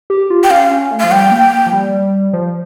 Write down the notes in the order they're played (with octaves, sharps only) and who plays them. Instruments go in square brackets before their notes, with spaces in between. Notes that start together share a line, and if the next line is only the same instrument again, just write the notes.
[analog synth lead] G4
F4
[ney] G5
[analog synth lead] C#4 [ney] F5
[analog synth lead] C#4
A3
[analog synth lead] F3 [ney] F5
[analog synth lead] G3 [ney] G5
[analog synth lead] A#3
F3
G3
F3